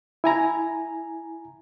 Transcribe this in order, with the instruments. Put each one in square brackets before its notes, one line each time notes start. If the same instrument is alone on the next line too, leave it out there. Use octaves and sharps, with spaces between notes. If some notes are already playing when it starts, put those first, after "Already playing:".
[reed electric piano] E4 G#5 A#5